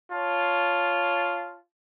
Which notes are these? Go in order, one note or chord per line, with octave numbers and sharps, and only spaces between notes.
F4 C#5 A5